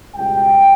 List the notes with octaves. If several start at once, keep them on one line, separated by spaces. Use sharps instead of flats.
C#2 B2 G3 G5